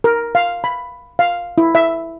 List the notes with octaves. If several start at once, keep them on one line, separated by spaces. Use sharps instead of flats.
A#4
F5
B5
F5
E4
E5